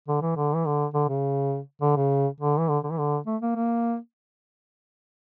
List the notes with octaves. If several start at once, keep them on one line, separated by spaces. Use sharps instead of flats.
D3
E3
D3
E3
D3
D3
C#3
D3
C#3
D3
E3
D3
D3
E3
D3
A3
A#3
A#3